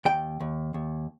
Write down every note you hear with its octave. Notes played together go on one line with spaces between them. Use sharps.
D#2 G5
D#2
D#2